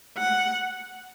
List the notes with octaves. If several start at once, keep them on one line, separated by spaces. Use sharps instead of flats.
F#5